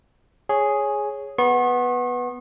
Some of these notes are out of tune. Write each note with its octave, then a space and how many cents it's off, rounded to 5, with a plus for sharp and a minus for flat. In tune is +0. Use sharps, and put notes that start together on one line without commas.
G#4 +0 C#5 +0
B3 +0 C#6 -45